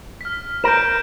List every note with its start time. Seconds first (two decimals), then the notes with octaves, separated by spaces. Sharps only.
0.21 F6 B6
0.64 A#4 G6 D7 E7